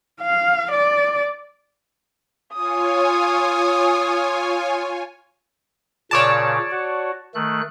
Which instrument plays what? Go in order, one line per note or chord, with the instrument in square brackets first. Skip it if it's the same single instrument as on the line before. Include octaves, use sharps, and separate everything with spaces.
[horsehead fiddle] F5
D5
[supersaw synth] F4 C#5 G#5 [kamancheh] D#6
[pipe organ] A#2 C#3 [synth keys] C#5 D5 A5
[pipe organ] F#4
D#3 A3 F#6